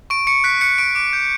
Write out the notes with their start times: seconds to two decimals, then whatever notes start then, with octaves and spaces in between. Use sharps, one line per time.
0.10 C#6 D7
0.27 C#6 C#7
0.44 F#6 B6
0.61 F#6 C#7
0.78 C#6 D7
0.95 D6 D7
1.13 G6